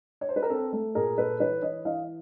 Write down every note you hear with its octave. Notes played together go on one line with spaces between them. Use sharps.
C#5
C5
B4
A#4
C4 A4
A3 A4
A#2 G#4 A#4
A#2 A4 B4
E3 B4 C#5
E3 C#5 D#5
E3 D#5 F5